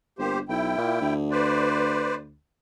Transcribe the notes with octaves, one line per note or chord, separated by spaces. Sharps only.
G1 A#3 G4 C5
B1 E4 G5
A#2
D2
B4 C5 D5